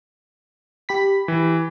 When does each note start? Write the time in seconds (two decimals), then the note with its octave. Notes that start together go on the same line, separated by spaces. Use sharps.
0.89 G4 B5 B6
1.28 E3